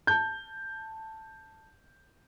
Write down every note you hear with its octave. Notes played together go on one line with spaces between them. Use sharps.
A5 G6